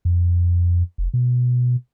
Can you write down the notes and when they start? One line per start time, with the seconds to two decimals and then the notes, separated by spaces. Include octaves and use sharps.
0.05 F2
0.98 F1
1.14 B2